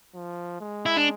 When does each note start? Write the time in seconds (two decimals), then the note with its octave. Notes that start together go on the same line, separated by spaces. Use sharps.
0.14 F3
0.61 G#3
0.86 E4
0.96 D4